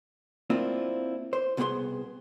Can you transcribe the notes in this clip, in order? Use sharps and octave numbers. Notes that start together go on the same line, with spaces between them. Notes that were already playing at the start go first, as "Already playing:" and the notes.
A#3 C4 D4 E4 F4
C5
C2 B2 B3 G4 G#4 C6